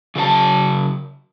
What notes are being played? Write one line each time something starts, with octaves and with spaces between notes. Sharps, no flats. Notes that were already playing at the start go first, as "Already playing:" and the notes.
C#3 F#3 C5 A5